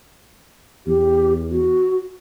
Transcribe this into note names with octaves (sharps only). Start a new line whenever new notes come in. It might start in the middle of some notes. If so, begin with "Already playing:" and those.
E2 G4
F#4